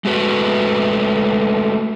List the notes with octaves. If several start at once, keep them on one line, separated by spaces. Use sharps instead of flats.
G#3 A3 F#4 B4